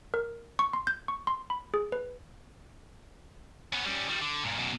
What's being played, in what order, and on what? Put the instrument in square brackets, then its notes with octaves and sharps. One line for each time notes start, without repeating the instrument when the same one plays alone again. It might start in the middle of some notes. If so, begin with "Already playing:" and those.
[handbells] A#4
C#6
C6
G6
C#6
C6
B5
G#4
B4
[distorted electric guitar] B3 C#4
G3 C#4
D#3 G3
D3
G2 A#2
F#2 B2